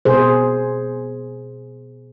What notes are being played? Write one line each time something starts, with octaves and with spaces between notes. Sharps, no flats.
B2 G#4 C5